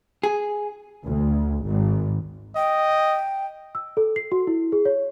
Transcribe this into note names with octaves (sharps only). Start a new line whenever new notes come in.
G#4
D2
G#1
D#5 G5
E6
A4
C7
F#4
E4
G#4
C#5